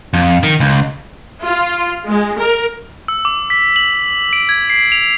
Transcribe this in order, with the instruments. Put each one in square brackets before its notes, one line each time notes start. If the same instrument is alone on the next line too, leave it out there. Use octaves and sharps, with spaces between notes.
[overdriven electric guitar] F2
D#3
C#2
[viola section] F4
G#3
A#4
[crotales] E6
D6
B6
F#7
D7
G#6
C7
F7